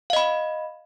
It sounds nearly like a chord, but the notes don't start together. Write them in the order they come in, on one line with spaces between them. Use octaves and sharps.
F5 D#5 B5